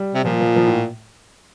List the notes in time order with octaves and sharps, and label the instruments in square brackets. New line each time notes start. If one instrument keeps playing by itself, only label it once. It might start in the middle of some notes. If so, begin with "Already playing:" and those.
Already playing: [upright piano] G3
[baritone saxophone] C3
[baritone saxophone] A#2 [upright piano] F3
[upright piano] F3
F3
A2